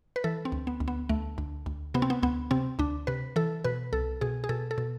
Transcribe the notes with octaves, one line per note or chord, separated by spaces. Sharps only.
B4
E3 A4
C4
D2
B3
D2
B3
D2 A3
D2
D2
C3 B3
C4
B3
D2 B3
C3 C4
D2 D4
C3 B4
E3 A4
B2 B4
C2 A4
B2 G#4
G#4
B2 A4
A4
B2